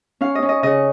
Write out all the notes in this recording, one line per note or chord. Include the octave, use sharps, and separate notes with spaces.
C#4 F5
D#5
C#4
D#5
C#3 D#5